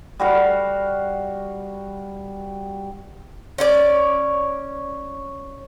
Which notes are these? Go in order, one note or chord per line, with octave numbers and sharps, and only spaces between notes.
G3 F#4 F5
C#4 C#5 D5